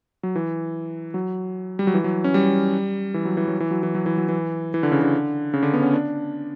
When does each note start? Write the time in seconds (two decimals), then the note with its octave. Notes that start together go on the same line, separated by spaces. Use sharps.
0.23 F#3
0.36 E3
1.14 F#3
1.79 G3
1.87 F#3
1.94 E3
2.04 F#3
2.24 C#4
2.34 G3
3.14 E3
3.25 F#3
3.37 E3
3.48 F#3
3.60 E3
3.71 F#3
3.83 E3
3.95 F#3
4.06 E3
4.18 F#3
4.29 E3
4.74 E3
4.83 D3
4.92 C#3
5.02 D3
5.53 C#3
5.63 D3
5.74 B3
5.82 C#4
5.93 D4